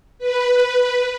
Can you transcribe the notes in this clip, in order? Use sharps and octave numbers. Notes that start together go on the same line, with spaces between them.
B4